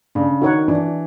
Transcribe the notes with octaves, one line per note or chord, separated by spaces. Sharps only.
C#3 D4
D#3 F#4 A#4 C#5 F#5
E3 D4